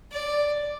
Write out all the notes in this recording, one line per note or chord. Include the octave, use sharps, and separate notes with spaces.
D5